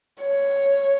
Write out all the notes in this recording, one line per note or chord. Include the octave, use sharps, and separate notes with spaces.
C#5